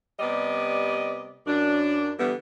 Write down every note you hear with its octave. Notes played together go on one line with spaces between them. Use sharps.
C3 G3 B3 D5 D#5
F#2 D4
D3 E3 G3 B3